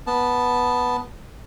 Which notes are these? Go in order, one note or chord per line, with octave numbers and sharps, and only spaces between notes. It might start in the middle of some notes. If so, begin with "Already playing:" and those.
B3 A5